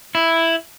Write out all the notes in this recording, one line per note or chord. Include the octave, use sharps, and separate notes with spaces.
E4